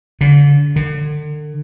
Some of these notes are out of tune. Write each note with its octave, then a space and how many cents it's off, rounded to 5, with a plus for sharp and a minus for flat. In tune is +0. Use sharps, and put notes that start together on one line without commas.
D3 -40
D3 +40